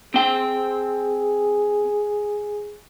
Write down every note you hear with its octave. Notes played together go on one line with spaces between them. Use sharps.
C4 G#4 G5